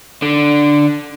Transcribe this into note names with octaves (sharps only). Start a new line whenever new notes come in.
D3